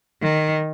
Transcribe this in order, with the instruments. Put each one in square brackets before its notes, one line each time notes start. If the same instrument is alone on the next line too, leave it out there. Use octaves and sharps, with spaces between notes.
[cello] D#3